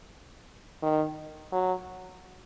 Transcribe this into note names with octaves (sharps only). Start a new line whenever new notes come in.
D#3
F#3